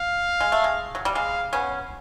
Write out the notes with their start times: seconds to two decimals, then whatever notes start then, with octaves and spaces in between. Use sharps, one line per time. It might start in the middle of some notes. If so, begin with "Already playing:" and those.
Already playing: F5
0.41 G#3
0.52 A3
0.64 G#3
0.95 F#3
1.05 G3
1.15 G#3 F5
1.53 B3 C#4